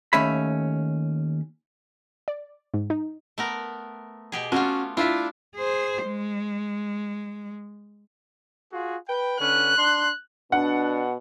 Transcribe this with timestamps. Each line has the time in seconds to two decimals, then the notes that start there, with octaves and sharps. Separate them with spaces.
0.13 D#2 A3 C#4 E5 B5
2.28 D5
2.74 G#2
2.90 D#4
3.38 A3 B3 A#4
4.32 B2 G4 G#4
4.52 A3 B3 C#4 F4 F#4
4.97 D4 E4 F4 E5
5.56 G#4 C5
6.05 G#3
8.72 F4 F#4 G#4
9.08 B4 G5
9.40 D3 C#4 B4 F#6
9.78 D4 C6
10.52 B2 D4 F#5